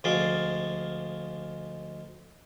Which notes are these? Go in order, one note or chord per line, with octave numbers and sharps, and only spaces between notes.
D2 F3 G#3 D5 F5